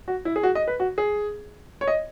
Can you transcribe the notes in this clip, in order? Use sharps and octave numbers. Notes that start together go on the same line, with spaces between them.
F#4
E4
G#4
F#4
D#5
B4
F#4
G#4
C#5
D#5